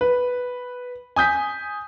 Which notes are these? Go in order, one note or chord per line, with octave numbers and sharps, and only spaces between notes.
B4
G#5 D#6 G6 B6